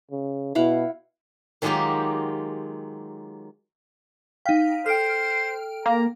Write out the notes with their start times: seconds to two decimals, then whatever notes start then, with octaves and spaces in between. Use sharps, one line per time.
0.11 C#3
0.55 B2 E4 F5 F#5
1.62 D#3 F#3 G#3 A#3 F4 G4
4.46 D#4 F5 G5 F6 B6
4.86 A4 C5 G5 F6 D7
5.86 A#3 A#5